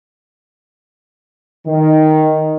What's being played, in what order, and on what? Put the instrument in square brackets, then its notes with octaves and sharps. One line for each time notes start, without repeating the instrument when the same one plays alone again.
[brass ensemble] D#3